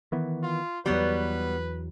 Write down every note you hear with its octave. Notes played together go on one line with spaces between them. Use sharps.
D#3 E3 B3
F4
E2 F#3 G3 B3 B4 C#5